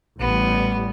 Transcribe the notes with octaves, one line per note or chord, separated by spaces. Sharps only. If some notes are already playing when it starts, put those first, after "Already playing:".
A1 E3 G3 B3